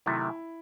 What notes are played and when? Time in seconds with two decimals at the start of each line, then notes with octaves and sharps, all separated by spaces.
0.06 C3 D#3 F#3 A3 E4